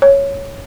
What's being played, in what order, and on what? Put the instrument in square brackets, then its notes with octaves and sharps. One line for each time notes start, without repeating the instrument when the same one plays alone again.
[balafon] C#5